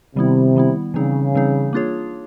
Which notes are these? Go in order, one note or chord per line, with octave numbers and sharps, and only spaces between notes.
C3 D#3 G3 B3 E4
D#3 G3 B3 E4
C#3 E3 G3 C4 D#4 G#4
E3 G3 C4 D#4 G#4
A#3 D4 F4 G#4 C#5